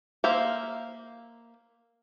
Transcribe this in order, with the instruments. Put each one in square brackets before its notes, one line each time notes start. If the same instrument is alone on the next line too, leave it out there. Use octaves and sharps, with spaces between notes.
[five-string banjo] A#3 C5 E5 F5